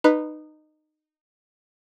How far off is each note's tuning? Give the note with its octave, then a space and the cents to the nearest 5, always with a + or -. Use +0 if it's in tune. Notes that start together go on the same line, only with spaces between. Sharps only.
D#4 -20 B4 +0